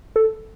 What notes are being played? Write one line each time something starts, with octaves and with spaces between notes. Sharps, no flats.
A4